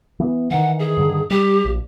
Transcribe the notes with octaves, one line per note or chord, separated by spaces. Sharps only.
E3 B3
D#3 E3 F#5
G#4
G2 D3 D#3
G3 G4
A#1